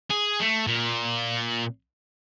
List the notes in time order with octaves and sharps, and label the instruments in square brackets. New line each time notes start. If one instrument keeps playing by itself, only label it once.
[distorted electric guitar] G#4
A3
A#2